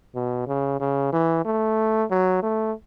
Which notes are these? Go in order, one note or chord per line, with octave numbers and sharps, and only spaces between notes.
B2
C#3
C#3
E3
A3
F#3
A3